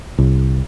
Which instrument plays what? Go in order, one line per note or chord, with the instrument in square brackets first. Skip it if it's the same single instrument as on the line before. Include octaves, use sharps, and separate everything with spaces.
[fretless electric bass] C2